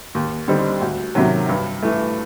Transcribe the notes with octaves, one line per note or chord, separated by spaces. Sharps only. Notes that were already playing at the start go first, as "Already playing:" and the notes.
D#2
D3 G3 C4 D#4
D2
C3 D#3 F#3
G2
E3 A3